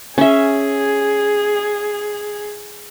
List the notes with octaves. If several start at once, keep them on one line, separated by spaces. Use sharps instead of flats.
C#4 G#4 E5